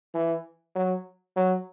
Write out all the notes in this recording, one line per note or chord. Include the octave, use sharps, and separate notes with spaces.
E3
F#3
F#3